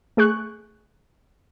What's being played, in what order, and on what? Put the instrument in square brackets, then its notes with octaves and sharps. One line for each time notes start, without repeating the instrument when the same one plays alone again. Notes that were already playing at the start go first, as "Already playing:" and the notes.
[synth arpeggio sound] A3 G#4 C#6 F#6